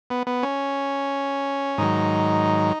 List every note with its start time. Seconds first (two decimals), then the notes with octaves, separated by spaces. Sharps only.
0.10 B3
0.27 B3
0.43 C#4
1.78 G#2 D#3 F#3 D#4